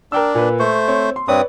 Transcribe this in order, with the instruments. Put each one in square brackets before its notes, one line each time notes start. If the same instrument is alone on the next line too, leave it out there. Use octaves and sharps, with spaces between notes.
[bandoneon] D4 [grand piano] A#4 G5 E6
[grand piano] A#2 B4
[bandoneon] A3 C5 [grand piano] C#6
[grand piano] C4 C#5
C6
[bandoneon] G2 C4 D#6 [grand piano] B4 C#5 D5